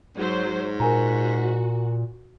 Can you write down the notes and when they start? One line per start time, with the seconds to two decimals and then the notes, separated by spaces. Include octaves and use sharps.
0.17 G#2 F#3 C5
0.80 A#2 F#4 A#4 G#5 A#5